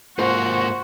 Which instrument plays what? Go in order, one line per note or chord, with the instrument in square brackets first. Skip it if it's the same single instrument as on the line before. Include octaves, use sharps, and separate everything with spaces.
[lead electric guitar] G#2 A#3 [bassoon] F3 [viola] F#4 [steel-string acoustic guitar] C5